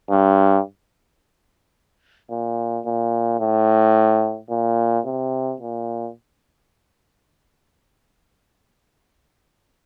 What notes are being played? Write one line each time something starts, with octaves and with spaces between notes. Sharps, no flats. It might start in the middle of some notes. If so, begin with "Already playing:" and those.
G2
A#2
A#2
A2
A#2
C3
A#2